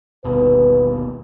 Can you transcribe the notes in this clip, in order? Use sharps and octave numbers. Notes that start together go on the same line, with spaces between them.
G1 D#2 B2 B4